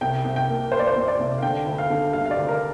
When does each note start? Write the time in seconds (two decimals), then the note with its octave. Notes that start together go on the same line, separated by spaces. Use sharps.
0.01 C2 G5
0.24 C2
0.36 G5
0.49 A#3
0.72 A#3 C5
0.79 D5
0.87 C5
0.96 A#2
1.08 D5
1.19 C2
1.38 F5
1.42 D3 G5
1.66 D2
1.78 F5
1.90 D3
2.13 G3 F5
2.26 F5
2.31 D5
2.37 D2
2.48 A#4